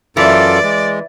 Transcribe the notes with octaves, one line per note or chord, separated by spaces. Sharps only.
F#2 E3 F4 A4 D5
G#3